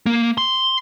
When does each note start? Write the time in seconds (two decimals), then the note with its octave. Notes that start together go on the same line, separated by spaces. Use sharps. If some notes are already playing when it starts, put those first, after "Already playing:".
0.06 A#3
0.38 C6